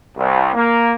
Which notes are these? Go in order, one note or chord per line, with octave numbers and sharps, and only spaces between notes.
C2
A#3